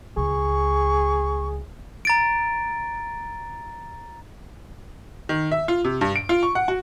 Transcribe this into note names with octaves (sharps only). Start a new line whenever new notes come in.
C#2 G#4 C#6
A#5 A6 D7
D#3
E5
F4
C3
G2
D7
F4
C#6
F#5
F#4